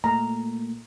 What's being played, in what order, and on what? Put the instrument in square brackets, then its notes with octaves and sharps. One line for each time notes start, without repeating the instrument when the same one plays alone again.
[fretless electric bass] A#2 A3 [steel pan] A#5